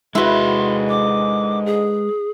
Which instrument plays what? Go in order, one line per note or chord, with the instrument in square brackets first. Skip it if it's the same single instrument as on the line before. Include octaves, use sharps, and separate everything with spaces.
[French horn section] G#2 D3 D#5 [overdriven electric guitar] G#3 B4 [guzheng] E4 F#4 [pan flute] C6
[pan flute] D6
G#4